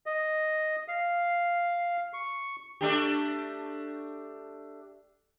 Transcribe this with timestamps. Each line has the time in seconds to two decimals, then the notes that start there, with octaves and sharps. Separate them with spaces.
0.06 D#5
0.88 F5
2.14 C#6
2.81 A3 D4 G4